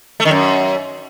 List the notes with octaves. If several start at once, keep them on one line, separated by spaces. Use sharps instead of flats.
A3
D#3
F#2